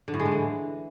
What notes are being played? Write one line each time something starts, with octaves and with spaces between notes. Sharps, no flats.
D3
A2
G#3
D3
E3